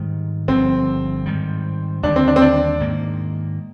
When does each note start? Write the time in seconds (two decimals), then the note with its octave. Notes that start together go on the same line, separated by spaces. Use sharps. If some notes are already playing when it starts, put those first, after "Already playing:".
Already playing: G#2 D#3 G3
0.47 G1 G2 F3 C4
1.26 G#2 D#3 G3
2.03 D#2 D3 G3 D4
2.16 C4
2.28 D4
2.36 C4
2.42 D4
2.80 G#2 D#3 A#3